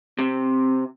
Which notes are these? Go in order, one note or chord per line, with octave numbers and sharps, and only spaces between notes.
C3 C4